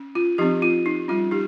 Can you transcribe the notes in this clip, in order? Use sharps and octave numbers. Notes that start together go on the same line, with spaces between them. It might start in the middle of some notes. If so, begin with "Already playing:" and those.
Already playing: C#4
F4
F3 C4 D#4 G4
F4
D#4
G3 C#4 F4
D#4 G4